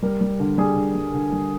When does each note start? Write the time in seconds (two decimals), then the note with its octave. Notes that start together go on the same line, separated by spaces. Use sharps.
0.02 G3 A#4
0.21 G3
0.40 D3
0.58 G3 G#4
0.76 D3
0.95 G3
1.14 D3
1.32 G3